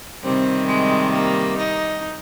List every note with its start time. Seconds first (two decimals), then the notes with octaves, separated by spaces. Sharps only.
0.24 C3 D#3 G3 C4
0.68 G#3
1.13 A#3
1.58 D#4